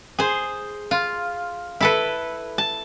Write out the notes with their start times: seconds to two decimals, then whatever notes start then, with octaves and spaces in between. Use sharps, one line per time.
0.19 G#4 C5
0.91 F4
1.80 E4 A4 B4
2.58 A5